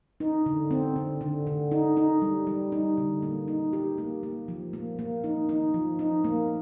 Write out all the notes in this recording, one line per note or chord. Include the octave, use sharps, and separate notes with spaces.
D#4
D3
C4
D3
D3
D3
D#4
D#4
G3
G3
D#4
D3
A#3
D#4
G4
A#3
A#3
F3
A#3
A#3
D#4
D#4
F3
D#4
A#3